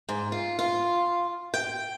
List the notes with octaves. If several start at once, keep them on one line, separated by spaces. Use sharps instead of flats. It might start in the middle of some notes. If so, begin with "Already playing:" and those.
G#2
F4
F4
G5